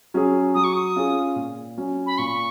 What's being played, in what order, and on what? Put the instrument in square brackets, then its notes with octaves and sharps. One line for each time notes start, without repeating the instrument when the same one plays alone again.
[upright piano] F#3 C#4 G#4
[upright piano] F#3 [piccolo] D#6
[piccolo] C#6
D#6
[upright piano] C#4 F4 G#4
A#2
F#3 C#4
[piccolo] B5
[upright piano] A#2 [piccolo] C#6